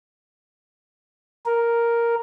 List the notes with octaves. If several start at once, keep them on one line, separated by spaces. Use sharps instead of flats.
A#4